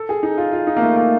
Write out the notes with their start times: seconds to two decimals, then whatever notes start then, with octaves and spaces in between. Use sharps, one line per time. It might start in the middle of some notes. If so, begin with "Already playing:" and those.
Already playing: A4
0.09 G#4
0.23 D#4
0.38 F4
0.53 F4
0.67 D#4
0.77 A#3
0.81 A3
0.96 A#3